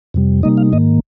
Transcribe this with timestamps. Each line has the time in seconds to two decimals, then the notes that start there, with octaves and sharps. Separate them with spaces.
0.14 F2 C3 G3
0.43 C3 G3 A#3 D#4 D#5
0.57 F5
0.72 G#2 D#3 A#3 D#5